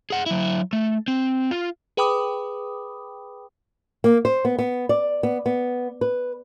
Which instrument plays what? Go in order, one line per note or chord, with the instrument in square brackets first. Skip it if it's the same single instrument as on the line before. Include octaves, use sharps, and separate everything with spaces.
[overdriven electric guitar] G#4 F#5
F#3 E4
A3
C4
F4
[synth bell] G#4 B4 G5 B5 D6 D#6
[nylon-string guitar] A#3
C5
B3
B3
D5
B3
B3
B4